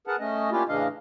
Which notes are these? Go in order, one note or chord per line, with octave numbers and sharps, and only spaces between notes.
G#4 A#4 B4 F#5 A5
A3 C#4 D#5
A#3 C#4 D4 E4 F4 G4
A2 C#3 E3 D4 D#5 F5